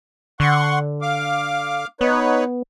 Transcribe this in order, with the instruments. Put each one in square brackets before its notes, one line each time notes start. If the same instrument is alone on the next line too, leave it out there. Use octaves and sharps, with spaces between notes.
[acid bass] D3 [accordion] F#5 C6 C#6
[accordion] F5 D6
[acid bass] B3 [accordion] D#4 B4 C#5